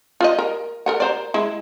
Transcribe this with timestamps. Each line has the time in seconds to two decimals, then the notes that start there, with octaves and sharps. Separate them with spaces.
0.21 F4 C5 D#5
0.39 A#4
0.86 A4 A#4 F#5
1.00 A#4 C5 D5
1.34 G#3 E4